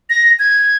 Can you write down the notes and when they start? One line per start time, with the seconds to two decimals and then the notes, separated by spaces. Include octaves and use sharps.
0.10 A#6
0.39 G#6